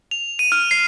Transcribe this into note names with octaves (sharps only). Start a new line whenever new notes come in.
F7
D#7
F6
C7